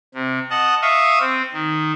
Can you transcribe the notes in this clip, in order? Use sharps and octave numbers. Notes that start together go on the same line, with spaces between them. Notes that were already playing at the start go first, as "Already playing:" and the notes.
C3
D#5 F#5 A5
E5 F5 C#6 D#6
C4
D#3